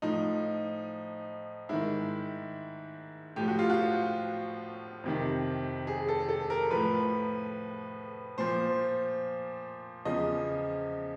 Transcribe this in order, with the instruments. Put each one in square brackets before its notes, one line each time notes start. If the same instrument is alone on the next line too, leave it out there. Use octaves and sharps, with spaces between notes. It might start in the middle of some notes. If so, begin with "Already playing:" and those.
[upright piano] A2 F3 D#4
G#2 D#3 E4
A2 F3 G4
F#4
F4
F#4
F2 C3 D#3
G#4
A4
A4
A#4
A2 F3 B4
A#2 F3 C5
E2 C#3 F3 D#5